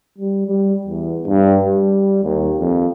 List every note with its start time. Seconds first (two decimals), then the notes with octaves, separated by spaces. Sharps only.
0.18 G3
0.47 G3
0.87 E2
1.26 G2
1.65 G3
2.23 D#2
2.59 F2